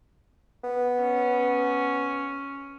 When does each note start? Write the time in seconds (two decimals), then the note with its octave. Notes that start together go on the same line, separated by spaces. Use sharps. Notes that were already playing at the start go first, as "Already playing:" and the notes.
0.64 B3
1.01 C#4